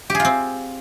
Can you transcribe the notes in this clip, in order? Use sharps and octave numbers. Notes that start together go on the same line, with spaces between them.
C4 F4 G4 G#4